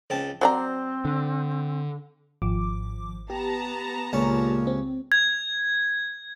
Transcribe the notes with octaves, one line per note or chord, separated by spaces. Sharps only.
C#2 C4 A5
F#3 C4 C5 D5 A#5
D3
G#1 F3 D6
B3 G4 A5 A#5
C#2 A#2 C#4
C4
G#6